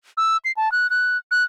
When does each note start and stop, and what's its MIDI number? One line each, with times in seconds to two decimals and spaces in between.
0.17 0.37 88
0.45 0.52 96
0.56 0.71 81
0.72 0.89 90
0.90 1.17 90
1.31 1.43 90